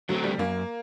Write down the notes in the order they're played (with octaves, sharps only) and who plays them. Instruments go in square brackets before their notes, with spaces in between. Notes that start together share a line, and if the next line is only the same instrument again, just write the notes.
[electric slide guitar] D3 A3 C4 [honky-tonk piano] F#3
[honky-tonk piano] G3
[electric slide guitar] F#2 [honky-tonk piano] A#3